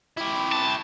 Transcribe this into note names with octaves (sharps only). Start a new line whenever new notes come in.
E4 G4
A5